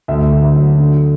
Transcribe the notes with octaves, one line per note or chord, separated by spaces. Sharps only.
D2 E5
D2
E5
F#3
D3